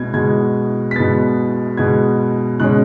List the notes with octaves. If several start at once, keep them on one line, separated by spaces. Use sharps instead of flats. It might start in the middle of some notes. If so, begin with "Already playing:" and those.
Already playing: B2 G#3 B3 G#6
B2 G#3 B3 G#6
B6
B2 G#3 B3 A6
B2 G#3 B3 G#6
B2 G#3 C#4 F#6